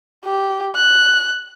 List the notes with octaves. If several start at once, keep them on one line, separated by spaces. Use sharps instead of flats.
G4
F#6